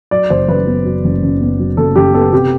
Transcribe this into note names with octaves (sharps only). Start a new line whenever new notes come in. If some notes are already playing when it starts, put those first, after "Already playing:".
F#3 D5
F#1 C5
F#2 B4
B3
F#3
F#1
F#2
B3
F#3
F#1 A4
F#2 G4
B3 A4
C3 G4